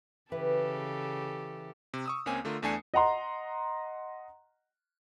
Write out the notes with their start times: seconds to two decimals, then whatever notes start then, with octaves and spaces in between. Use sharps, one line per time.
0.32 C#3 E3 G4 A4 B4
1.94 C3
2.06 C#6 D#6 E6
2.26 C#2 A#3 C4 C#4 G#5
2.45 D3 A3 F4 A#4
2.62 E2 A3 D4 G#5 C7 C#7
2.94 D#5 F#5 A#5 C6